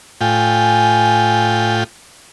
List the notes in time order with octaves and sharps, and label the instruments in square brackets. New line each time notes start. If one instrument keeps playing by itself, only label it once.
[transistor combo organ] A2 F4 G5 [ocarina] G#5